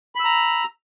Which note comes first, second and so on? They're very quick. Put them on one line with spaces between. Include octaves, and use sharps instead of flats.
B5 E6 A#5